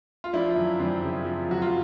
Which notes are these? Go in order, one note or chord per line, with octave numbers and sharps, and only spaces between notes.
F4
F3 D4 E4
F#2
F#2 C4 D4
C#3
F3
F#2 F#4
F4